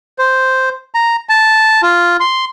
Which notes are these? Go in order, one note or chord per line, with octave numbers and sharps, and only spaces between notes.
C5
A#5
A5
F4
C6